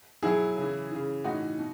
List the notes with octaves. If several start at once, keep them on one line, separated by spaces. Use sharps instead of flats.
B2 F#3 E4 G#4
C#3 E3
C#3 E3
A2 E3 D#4 F#4
B2